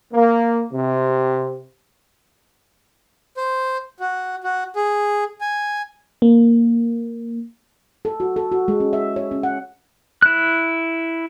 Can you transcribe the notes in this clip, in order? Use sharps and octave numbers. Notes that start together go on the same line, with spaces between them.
A#3
C3
C5
F#4
F#4
G#4
G#5
A#3
A4
F#4
A4
F#4
G#3
C#4
E5
C#5
C#4
F#5
E4 F#6